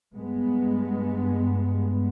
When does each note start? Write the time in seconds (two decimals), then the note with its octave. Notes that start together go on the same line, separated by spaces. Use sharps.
0.13 G2 G#3 B3